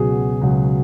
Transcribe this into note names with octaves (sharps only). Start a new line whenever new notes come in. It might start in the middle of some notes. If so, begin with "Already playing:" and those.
Already playing: C#2 B2 F#3 G#4
C#2 B2 F#3